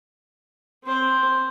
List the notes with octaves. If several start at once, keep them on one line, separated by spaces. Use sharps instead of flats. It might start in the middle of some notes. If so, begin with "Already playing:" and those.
C4 C5